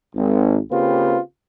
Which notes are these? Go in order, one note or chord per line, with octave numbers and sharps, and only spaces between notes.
G#1
C#3 A#3 C4 F4 G4 B4